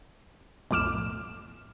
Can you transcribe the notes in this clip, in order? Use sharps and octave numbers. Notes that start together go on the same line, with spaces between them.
B1 F2 A2 D6 F6 E7